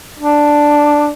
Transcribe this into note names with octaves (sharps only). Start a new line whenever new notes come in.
D4